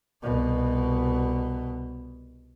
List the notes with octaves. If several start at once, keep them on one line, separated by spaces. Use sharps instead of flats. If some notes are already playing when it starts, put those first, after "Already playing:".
C2 B2